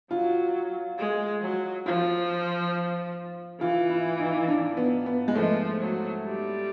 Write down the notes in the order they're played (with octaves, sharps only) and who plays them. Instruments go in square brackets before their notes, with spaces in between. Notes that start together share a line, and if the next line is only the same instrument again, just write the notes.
[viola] F#3 [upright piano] F4
[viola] G#3
F#3
[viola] F3 [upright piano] F4
[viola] E3 [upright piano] F4
[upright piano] E4
D#4
D4
B3
B3
G#3
[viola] F3 [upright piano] A3
[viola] F#3
G3